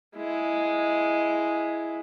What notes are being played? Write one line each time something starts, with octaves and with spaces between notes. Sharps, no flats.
G#3 E4